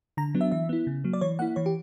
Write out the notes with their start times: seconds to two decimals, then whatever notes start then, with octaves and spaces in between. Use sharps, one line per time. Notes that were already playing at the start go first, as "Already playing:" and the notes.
0.17 D3 A#5
0.34 F#3 B3 D4
0.41 E5
0.51 E3 E5
0.69 B3 E4
0.87 C#3
1.04 F#3 A#3
1.13 D5
1.21 E3 C#5
1.39 A#3 E4 F#5
1.56 E3 C#5
1.66 G4